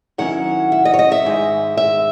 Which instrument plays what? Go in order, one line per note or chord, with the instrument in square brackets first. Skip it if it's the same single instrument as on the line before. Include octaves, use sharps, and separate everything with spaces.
[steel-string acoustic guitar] D#3 F#3 C#4 E4 F#5
E5
D#5
C#5
D#5
E5
G#2 D#3 G#3
E5